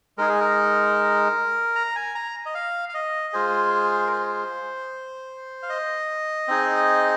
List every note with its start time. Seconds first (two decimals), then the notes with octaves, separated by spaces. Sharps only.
0.18 G#3 D#4 G#4 A#4
0.29 G#4
0.40 A#4
1.75 A#5
1.95 G#5
2.15 A#5
2.46 D#5
2.55 F5
2.89 F5
2.94 D#5
3.33 G#3 F4 G#4 C5
4.07 A#4
4.12 C5
5.63 F5
5.69 D#5
6.48 C4 D#4 G#4